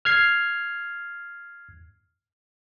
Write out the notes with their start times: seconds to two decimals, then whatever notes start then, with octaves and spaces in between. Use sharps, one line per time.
0.05 F6 G#6 C7